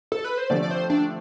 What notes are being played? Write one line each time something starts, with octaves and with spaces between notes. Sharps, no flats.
A4
B4
C5
D3 F3 A3 C4 G4 D5
D5
C5
D4